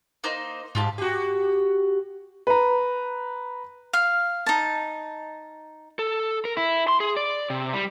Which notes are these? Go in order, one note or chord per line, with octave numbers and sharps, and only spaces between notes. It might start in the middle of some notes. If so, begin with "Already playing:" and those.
A#3 D#4 C5
G#2 F4 G4 A5
F#4 G4
B4 A#5
F5
D#4 A5
A4
A#4
E4
C6
G#4
D5
C3
G3